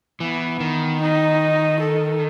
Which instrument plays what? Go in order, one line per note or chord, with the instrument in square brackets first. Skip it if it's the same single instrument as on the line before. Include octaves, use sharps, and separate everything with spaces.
[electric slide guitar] E3 [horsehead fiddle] B3
[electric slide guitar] D#3
[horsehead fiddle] D#4
A4